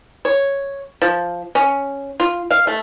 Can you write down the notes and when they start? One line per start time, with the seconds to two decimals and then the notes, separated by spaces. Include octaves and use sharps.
0.25 C#5
1.02 F3
1.55 C#4
2.20 F4
2.51 F5
2.67 A3